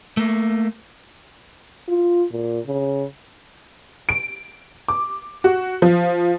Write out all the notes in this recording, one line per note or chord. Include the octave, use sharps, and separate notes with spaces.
A3 A#3
F4
A#2
C#3
D7
D6
F#4
F3